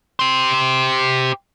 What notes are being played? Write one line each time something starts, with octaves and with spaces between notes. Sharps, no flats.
G4 C5